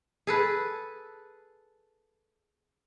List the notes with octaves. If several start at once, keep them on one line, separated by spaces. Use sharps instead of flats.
G#4 A4 B4